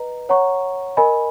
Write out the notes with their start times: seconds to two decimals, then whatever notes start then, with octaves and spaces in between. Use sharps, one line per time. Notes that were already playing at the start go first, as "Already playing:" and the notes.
Already playing: B4 D#5 A#5
0.29 C#5 F#5 A#5 C#6
0.97 A#4 D#5 G#5 B5